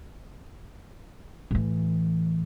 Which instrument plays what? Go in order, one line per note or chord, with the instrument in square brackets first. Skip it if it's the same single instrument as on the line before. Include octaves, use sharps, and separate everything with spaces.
[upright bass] A2 E3